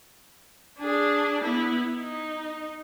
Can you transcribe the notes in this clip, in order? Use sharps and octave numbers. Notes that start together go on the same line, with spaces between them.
D4 G#4
B3 E4
D#4